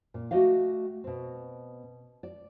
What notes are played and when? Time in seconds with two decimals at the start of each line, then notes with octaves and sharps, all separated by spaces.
0.14 A#2
0.31 A3 F#4 G4 D#5 F5
1.04 B2 C4
2.23 D5